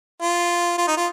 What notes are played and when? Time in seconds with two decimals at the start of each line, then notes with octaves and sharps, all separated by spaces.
0.22 F4
0.78 F4
0.88 D#4
0.97 F4